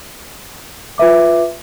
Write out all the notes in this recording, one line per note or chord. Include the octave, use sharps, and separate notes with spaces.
F4 B4 E5 D6